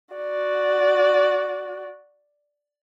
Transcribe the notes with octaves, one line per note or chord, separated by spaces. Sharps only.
F#4 D5